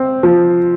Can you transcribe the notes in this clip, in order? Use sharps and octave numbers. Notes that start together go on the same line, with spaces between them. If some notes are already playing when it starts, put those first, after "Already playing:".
Already playing: C4
F3